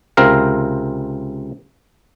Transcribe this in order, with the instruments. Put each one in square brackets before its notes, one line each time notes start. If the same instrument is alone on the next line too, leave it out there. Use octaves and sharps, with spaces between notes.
[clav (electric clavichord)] C#2 C3 C4 A#4 F5